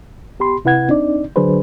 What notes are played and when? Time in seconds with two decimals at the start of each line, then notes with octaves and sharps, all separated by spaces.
0.39 B3 G4 B5 C6
0.65 C3 E4 B4 F#5 G#6
0.89 C4 D4 D#4 D5
1.36 D3 F#3 D4 G#4 B4 C5